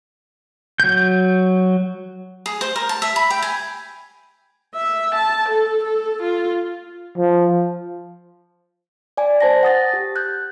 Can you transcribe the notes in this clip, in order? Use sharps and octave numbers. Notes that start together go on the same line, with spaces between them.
F#3 G6
G#4
C5
A#4
A5
E5
B5
G5
G#5
E5
A5
A4
A4
F4
F3
D5 G#5
C5 A5 A#6
F#5 D#6 A6 A#6
G4
F#6 G6